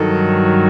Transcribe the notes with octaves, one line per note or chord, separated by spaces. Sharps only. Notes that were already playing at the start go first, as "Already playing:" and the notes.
Already playing: G2 D#3 F#3 A4